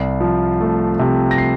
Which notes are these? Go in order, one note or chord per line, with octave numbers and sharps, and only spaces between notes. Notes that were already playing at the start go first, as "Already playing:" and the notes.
Already playing: C2 C7
F3
A3
C3
A#6
C7